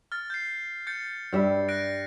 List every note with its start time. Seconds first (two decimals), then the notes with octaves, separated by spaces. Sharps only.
0.12 F6 A6
0.30 G6 C7
0.87 G6 A6 C#7
1.33 G2 G3 E5
1.69 F#6 A#6 D7